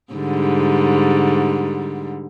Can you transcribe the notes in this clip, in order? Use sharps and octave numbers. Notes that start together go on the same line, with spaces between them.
G#2 D3 G3